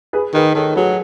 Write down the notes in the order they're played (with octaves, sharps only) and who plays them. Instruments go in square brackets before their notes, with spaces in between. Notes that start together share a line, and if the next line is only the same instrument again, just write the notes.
[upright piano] G#4 B4
[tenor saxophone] D#3 [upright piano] G#4 B4
[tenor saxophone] D#3 [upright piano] A4 C#5
[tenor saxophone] F#3 [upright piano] G#4 B4